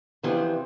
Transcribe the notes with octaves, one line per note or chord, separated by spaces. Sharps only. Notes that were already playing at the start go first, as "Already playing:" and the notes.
E2 C3 E3 F3